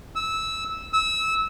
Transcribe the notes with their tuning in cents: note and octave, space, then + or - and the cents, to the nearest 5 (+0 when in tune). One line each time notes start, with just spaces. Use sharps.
E6 -15
E6 -20